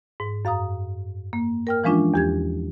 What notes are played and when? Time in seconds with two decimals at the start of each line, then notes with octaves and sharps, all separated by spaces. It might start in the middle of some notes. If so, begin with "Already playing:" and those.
0.20 G#2
0.45 F#2 F5 A#5 D#6
1.33 A#3
1.67 A#4 G5 F6
1.84 E3 F3 G#3 C#4 D4 F4
2.14 E2 G4 G#6